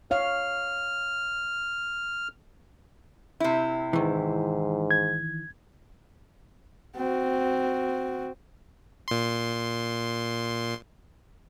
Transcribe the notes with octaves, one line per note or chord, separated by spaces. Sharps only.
C#5 F5 F6
C3 E4
G#2 D#3 E3
G#6
C4 F#4
A#2 C6